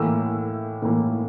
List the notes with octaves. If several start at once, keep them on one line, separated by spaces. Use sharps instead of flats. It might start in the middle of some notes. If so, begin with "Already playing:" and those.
Already playing: A2 E3 A#3 E6
A2 E3 A#3